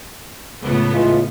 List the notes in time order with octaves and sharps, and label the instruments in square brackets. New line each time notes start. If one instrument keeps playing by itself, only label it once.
[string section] C#2 A2 B3
[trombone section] E3 G#3 F4